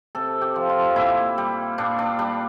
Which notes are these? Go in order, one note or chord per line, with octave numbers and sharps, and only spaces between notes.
C3 A4
G4
F3
F4
A#2 E4
G3
A#2 D4
D4
G3 D4